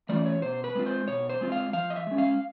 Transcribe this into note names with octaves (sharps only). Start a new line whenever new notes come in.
E3 A3 C#4 F4 D5
C#5
B2 C5
B4
G#3 C4 F4
C5
B2 C#5
C5
G#3 C4 F4
F5
F3 F5
D#5
E5
G#3 C#4
F5